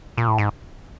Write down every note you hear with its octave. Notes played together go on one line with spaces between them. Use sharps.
A#2
A2
G#2